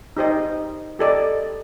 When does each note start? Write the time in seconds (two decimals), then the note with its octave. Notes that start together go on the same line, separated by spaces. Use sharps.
0.17 D#4 G4 C5 D#5
0.99 G4 A4 D5 D#5